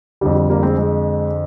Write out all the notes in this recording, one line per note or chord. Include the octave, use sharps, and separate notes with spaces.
F2 D3 G3
G3
G3 A#3
G#3 C4
G#3